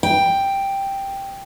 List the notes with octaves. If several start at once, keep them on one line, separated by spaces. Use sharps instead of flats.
G5